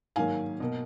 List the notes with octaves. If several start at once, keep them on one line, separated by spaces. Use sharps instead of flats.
G#2 D#3 F#3 A#3 F5 G#5
B2 A#3